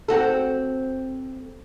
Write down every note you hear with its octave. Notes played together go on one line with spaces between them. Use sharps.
C4 F#4 A4